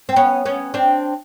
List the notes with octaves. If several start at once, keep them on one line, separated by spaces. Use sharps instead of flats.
C4
B3 C#4
B3 C#4
C4 D4